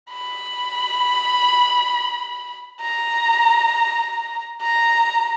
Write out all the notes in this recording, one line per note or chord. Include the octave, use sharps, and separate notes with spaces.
B5
A#5
A#5